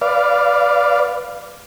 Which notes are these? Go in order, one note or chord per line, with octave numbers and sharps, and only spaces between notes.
B4 D5 F5